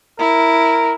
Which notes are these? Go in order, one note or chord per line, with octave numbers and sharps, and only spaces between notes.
E4 A#4